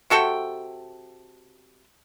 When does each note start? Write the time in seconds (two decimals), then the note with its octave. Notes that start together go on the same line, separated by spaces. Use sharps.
0.10 C3 F#4 A4 G5